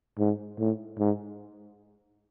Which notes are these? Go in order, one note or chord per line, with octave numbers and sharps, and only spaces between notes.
G#2
A2
G#2